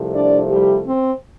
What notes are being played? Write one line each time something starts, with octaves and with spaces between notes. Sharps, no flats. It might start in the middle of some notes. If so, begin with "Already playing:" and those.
Already playing: C2 C3 F3 A3
D4 D5
G3 G4
C4